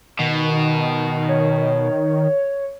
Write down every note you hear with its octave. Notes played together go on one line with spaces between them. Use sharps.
B2 D#3
C#5